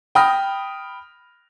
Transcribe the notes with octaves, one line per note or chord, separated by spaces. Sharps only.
G5 B5 D#6 F6 A#6